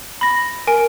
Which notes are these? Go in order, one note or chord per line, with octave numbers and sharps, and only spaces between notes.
B5 A#6
A#4 G#5 D7